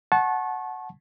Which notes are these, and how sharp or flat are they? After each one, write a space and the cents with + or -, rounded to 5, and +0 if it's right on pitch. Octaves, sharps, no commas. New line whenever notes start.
F#5 +0 A5 -25 C#6 -30